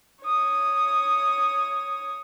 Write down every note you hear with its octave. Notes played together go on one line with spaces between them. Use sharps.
C#5 D#6